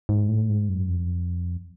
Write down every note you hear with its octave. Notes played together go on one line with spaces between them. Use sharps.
G#2
A2
G#2
F#2
F2